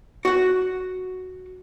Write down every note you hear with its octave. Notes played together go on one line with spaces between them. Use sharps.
F#4 F#5